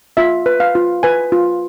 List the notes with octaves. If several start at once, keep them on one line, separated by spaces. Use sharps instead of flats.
F4 E5
B4
F5
F4
B4 G#5
F4